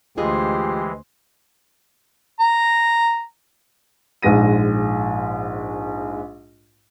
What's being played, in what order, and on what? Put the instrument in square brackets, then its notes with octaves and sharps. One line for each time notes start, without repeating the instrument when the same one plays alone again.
[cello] D2 C5 [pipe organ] E3 G#3 [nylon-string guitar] F4 G#4 D#5 [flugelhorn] G4
[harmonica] A#5
[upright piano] A#1 G#2 G#3 A#6 D#7